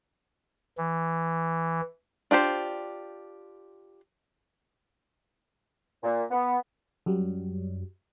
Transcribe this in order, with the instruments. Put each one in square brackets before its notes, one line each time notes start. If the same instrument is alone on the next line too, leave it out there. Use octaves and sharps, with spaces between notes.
[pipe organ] E3
[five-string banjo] D4 F4 G4 C5
[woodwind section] A#2
B3
[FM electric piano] F#2 F#3 G3